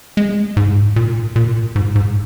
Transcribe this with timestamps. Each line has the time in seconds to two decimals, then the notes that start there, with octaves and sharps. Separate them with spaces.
0.17 G#3
0.57 G#2
0.96 A#2
1.36 A#2
1.76 G#2
1.95 G#2